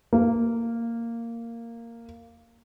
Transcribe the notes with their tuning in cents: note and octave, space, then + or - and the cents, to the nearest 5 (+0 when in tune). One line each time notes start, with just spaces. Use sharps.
A#3 -10